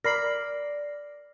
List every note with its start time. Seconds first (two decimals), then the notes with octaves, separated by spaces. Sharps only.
0.04 A#4 D5 B5 F6 A#6 C7